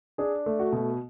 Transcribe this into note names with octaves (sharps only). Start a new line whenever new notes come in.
D4 G#4
A3
F#4
B2